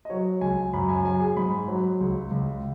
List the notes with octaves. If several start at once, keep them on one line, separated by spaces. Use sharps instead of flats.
D#5
F#3 C#5
C#2 G#5
F#2 B5
G#5
F#3 G#5
G#4
G#2 B5
F#3
C#2
C#2